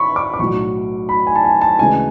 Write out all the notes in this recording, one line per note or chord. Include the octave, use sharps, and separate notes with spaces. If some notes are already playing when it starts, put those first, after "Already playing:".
Already playing: B5 C#6
D6
D6
B1 A2 F#3 C#6
B5
G#5
A5
G#5
A5
D2 C#3 E3 G#3 G#5